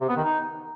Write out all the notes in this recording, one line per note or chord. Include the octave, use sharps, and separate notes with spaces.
C3
B3
D#3
D#4